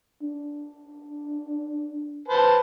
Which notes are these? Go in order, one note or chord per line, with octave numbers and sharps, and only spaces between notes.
D4
B4 C5 A5